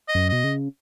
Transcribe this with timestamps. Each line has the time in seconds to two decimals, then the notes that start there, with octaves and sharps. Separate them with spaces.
0.08 D#5
0.15 F#2
0.29 B2 D#5
0.44 C#3